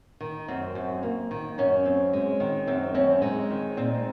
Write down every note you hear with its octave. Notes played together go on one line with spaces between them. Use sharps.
D#3
F#2 C4
F#2
A#3
D#3
F#2 C#4
C4
G#3
D#3
F#2 C4
C4 C#4
G#3 D#4
D#3
A#2 C4